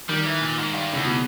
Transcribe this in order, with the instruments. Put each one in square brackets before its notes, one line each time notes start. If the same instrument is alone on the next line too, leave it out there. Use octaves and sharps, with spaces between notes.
[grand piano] D#3 [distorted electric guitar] G3
[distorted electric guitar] E3
A#2
G#2
G2
[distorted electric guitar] E2 [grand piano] C#3
[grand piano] B2